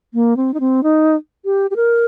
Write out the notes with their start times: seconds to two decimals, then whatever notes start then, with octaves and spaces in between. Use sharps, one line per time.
0.14 A#3
0.37 C4
0.54 D#4
0.60 C4
0.83 D#4
1.45 G4
1.71 G4
1.76 A#4